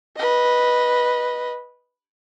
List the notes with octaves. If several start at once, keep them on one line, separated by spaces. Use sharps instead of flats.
B4 D#5